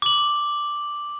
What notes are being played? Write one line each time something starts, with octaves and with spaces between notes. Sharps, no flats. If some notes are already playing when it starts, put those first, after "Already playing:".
D6 F#7